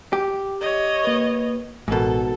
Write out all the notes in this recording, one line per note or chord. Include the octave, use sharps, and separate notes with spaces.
G4
C#5 D#5
A#3 B4
A1 G#2 B2 A4 A#4